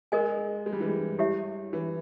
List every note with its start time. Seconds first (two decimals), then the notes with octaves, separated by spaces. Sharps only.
0.12 G#3 A#4 D#5 G#5
0.66 G#3
0.73 G3
0.80 E3
0.89 G3
1.19 E4 G4 C#5 E5
1.73 E3